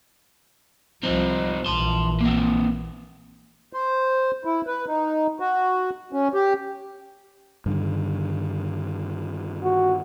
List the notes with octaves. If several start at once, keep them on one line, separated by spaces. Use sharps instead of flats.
C2 F3 C4 D#4
A#1 E3 A5 C6
A#3 C4
C5
E4
B4
D#4
F#4
C#4
G4
G2 D3 D#3
F#4